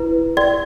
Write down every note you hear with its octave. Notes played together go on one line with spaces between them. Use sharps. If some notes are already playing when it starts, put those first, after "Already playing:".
Already playing: E4 B4
D5